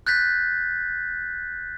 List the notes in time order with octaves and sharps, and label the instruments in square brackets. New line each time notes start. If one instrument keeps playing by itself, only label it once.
[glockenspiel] F#6 G6 A6 B6